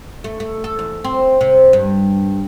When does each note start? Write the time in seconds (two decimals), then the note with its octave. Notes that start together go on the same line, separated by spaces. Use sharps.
0.24 A3
0.40 A3
0.64 A4
0.79 E2
1.04 C4
1.41 C3
1.73 G2